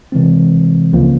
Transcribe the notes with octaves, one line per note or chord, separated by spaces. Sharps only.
C3 E3 G#3 C4
C#2 C#3 F3 A#3 C#4